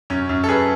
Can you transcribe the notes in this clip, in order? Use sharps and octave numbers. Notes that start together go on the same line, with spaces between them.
F#2 C#4
F#2
A4
F#2 G#4 B4